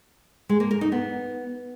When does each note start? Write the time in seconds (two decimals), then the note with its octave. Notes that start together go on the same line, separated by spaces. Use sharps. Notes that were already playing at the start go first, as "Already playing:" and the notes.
0.49 G#3
0.60 A#3
0.71 A#4
0.81 D#4
0.92 B3